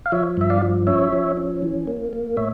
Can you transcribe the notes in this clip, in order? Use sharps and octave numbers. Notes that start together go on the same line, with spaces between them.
F5
F3 C#5 E5
G2 E5
D5 F5
F3
C#4 C#5 E5
F3
C#4
E3
A#3
A#3
A2 C#5 E5